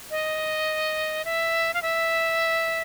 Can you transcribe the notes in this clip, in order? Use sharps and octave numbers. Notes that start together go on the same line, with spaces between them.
D#5
E5
F5
E5